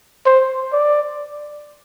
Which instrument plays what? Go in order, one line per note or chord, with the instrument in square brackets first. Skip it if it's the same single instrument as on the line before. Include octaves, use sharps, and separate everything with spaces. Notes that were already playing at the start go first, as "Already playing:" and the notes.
[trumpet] C5
D5